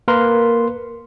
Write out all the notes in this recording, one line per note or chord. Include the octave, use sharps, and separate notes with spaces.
A#3 A#4 B4 C6